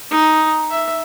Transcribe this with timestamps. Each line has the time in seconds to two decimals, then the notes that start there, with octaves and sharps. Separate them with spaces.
0.11 D#4
0.71 E5